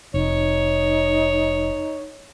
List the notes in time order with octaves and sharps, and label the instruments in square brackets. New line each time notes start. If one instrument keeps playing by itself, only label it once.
[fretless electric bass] F1 [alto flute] D#4 [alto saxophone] C#5